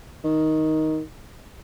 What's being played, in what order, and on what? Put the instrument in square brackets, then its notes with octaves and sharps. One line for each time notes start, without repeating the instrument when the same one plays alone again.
[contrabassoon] D#3